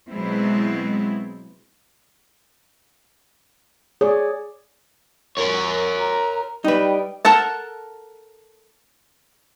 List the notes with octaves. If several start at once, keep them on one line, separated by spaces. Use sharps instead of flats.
B2 F#3 G#3 B3 C4 E4
G#4 C#5 D5
A#4 C#5
A#5
G3 D#4 B4 G5
A4 A#4 F#5 A5